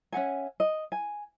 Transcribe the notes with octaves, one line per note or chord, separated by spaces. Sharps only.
C#4 E5 F#5 G#5
D#5
G#5